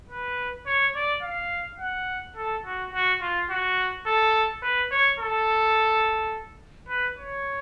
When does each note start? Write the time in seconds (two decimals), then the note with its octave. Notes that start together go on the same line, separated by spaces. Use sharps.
0.10 B4
0.66 C#5
0.95 D5
1.23 F5
1.79 F#5
2.36 A4
2.65 F#4
2.93 F#4
3.21 F4
3.50 F#4
4.06 A4
4.62 B4
4.91 C#5
5.20 A4
6.89 B4
7.17 C#5